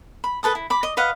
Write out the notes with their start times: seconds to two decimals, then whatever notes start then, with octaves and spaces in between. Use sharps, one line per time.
0.24 B5
0.43 A4 B4 A5 D#6
0.55 E4
0.70 B5 D6
0.83 D#5
0.97 B4 D#5 F5 F#5